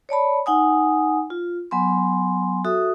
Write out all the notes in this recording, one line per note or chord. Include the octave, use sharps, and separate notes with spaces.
C#5 D5 A5 B5
D#4 F#5 G#5 D#6
F4
F#3 B3 G#5 C6
F#4 A4 E5 D#6